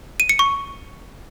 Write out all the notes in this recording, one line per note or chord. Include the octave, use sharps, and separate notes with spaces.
D#7
C#7
C#6